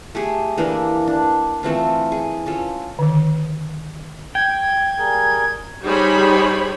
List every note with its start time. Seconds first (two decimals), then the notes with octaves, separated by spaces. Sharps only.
0.15 A3 G4 G#4
0.58 E3 A#3 D4 E4
1.07 D4
1.63 E3 A3 C4 F4
2.12 G#4
2.46 C#4 F4 A4
2.99 D3 D#3
4.35 G5 G#6
4.99 G3 G#4 A#4
5.84 G3 D#4 G#4 C5 C#5 B5